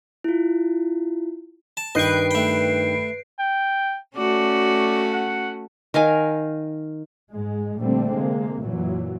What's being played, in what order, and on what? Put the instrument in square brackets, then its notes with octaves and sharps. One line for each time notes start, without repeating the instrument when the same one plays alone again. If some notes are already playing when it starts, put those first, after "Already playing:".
[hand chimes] E4 F4
[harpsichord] A5
[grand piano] G2 D#3 G6 [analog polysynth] B4 C7 D7 [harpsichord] D#5 C#6
[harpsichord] A3 G5
[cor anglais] G5
[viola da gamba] A3 C#4 F#4 [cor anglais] D5
[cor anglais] F#5
[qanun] D#3 A#4 F5 G#5
[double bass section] G#2 G#3
A#2 D3 G3 A3 C4
C3 G#3 A#3
F#2 A#2 E3 F#3